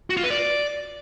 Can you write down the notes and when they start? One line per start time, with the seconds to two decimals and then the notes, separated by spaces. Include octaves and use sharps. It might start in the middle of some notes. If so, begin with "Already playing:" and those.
0.10 F#4
0.17 F4
0.24 B4
0.30 D5